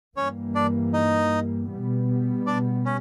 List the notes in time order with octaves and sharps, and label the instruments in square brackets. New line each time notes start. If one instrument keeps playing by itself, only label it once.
[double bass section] G2 E3 G3 A#3 [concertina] C#4 C#5
[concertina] D4 D5
D#4 D#5
[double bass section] B2 G3 B3
[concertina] D4 D5
C#4